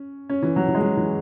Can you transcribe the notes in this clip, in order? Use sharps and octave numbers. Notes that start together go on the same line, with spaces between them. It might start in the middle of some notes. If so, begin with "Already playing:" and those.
Already playing: C#4
C#4
E3
F#3
E3
G#3
F#3
E3